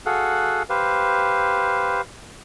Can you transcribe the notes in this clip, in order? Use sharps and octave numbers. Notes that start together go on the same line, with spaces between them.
F#4 G#4 A4 F5 F#5
G4 B4 C5 F5